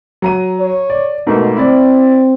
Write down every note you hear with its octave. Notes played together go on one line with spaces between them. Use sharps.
F#3 A#5 D#7
C#5
D5
G#2 B2 A3 A#3
C4 E4 D5